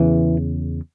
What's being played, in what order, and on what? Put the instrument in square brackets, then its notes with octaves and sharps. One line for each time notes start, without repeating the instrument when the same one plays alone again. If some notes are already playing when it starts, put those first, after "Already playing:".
Already playing: [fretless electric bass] E2 C#3 E3